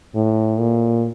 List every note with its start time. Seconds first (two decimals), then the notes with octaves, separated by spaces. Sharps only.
0.15 A2
0.59 A#2